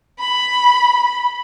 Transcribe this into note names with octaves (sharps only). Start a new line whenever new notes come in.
B5